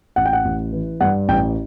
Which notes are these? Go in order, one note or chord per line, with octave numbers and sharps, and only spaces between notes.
A1 F#5
G5
F#5
A1
E3
G2 F#5
A1 G5